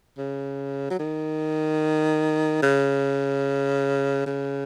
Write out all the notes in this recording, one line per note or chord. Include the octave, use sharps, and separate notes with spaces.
C#3
F#3
D#3
C#3
C#3